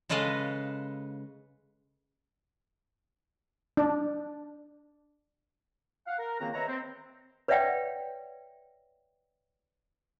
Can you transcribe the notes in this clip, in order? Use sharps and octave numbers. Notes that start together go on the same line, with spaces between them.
C#3 G#3 A4 B4 D#5 F5
D4
F5 F#5
A#4
C#2 D#3 A#3 C4 F#4 A#5
B4 C#5 D#5 E5 A#5
C4
B4 C#5 D5 E5 F#5 G5